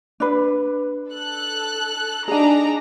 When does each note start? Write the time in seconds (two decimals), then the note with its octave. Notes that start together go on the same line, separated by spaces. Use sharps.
0.20 D4 B4
1.11 A4 F#6
2.28 D4 D#4 G#4 G#5 A#5